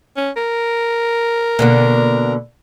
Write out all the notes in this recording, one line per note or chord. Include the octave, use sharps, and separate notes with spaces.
C#4
A#4
B2 D3 A#3